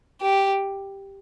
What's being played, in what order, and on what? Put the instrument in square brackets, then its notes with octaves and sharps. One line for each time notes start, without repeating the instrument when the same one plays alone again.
[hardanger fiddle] G4